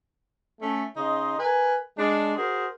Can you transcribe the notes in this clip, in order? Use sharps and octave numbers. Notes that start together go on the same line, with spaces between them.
A3 C#4
C#3 D#4 D#5 C6
A#4 B4 G#5
G#3 D4
F#4 G#4 A#4 C5